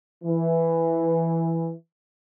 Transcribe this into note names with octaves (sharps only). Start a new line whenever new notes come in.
E3